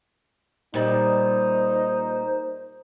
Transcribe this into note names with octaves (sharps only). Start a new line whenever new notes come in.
A#2 G3 D#4 C5